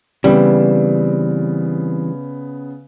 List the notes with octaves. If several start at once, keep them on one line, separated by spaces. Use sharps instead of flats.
C#3 E3 G3 B3 C4